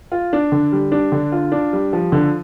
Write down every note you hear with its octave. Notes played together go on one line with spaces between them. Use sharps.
F4
D4
D3
G3
D4
D3
F4
D4
G3
F3
D3